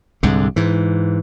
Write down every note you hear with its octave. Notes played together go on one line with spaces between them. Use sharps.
C2 G#2 D3
G#2 E3